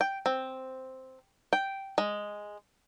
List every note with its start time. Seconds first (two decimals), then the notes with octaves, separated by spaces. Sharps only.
0.01 G5
0.26 C4
1.53 G5
1.98 G#3